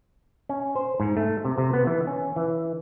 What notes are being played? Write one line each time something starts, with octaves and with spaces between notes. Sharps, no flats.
C#4
C5
G#2
A3
C3
C3
B3
E3
C#4
E3